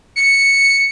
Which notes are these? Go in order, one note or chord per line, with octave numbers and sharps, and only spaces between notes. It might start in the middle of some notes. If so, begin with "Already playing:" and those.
C#7